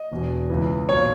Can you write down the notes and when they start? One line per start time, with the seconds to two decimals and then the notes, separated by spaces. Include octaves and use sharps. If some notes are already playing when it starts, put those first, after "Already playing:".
Already playing: D#5
0.12 E1 E2 B2
0.50 C#2 C#3 E3
0.88 B1 A#2 C#5